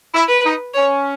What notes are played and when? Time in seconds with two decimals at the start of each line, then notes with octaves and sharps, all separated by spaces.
0.13 E4
0.28 B4
0.44 D#4
0.74 C#4 C#5